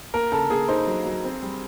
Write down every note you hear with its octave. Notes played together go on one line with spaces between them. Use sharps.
A#3 A#4
C#3 A4
A#3 G#4
D#4 C5
F#3
F#3
C4
G3